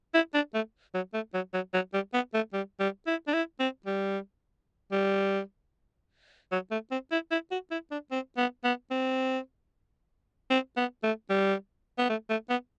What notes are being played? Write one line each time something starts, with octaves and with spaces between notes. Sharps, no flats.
E4
D4
A3
F#3
A3
F#3
F#3
F#3
G3
B3
A3
G3
G3
E4
D4
E4
C4
G3
G3
F#3
A3
C4
E4
E4
F#4
E4
D4
C4
B3
B3
C4
C4
B3
A3
G3
B3
A3
A3
B3